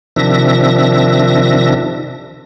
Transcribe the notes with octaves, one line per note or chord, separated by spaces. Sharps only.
C3 D#3 F3 D4 E5 A#6